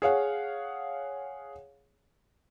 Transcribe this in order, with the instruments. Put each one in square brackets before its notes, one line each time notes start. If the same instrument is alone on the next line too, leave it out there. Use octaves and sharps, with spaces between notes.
[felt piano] G#4 C#5 F5 F#5